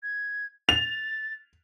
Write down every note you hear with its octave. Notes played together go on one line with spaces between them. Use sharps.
G#6
A6 F7